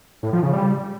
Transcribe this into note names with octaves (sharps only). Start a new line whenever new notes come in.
A2
F3
C#3
G3